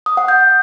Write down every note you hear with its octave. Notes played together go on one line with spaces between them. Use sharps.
D#6
F#5
G6